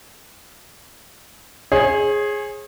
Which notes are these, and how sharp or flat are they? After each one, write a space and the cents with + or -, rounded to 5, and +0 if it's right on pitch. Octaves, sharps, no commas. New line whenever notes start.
G#4 +0 C#5 -40